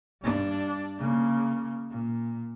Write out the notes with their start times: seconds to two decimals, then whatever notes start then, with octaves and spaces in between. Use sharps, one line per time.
0.21 G2 D4
0.98 C#3 A#3
1.90 A#2